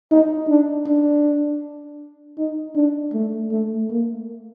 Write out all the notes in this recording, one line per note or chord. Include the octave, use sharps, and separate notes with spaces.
D#4
D4
D4
D#4
D4
A3
A3
A#3